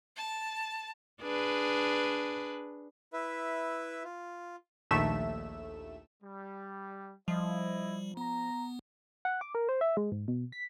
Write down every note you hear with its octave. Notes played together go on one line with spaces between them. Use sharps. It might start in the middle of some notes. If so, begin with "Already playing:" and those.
A5
D4 G#4 B4
E4 B4 E5
F4
A#1 D#2 A3 E5 E7
G3
F3 G3 E4 D#5
B3 A#5
F#5
D6
A#4
C5
E5
G#3
G#2
B2
B6